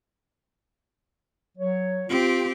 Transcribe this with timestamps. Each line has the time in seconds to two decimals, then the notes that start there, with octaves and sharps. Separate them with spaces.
1.57 F#3 C#5
2.09 C4 F4 G4